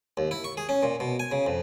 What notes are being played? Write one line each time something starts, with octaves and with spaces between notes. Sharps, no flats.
D#2
E4
C#6
G#4
C#4
A#2
B2
G#5
C#3
F2